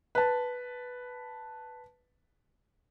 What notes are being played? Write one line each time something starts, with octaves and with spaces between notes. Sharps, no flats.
B4 A5